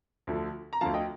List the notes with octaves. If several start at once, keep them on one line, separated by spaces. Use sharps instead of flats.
D2 D3 F3
A#5
D2 D3 F3 F5 A5
D#5 G5